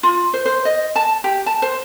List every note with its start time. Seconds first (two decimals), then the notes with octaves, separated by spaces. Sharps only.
0.03 F4
0.33 C5
0.46 C5
0.65 D#5
0.96 A5
1.24 G4
1.46 A5
1.62 C5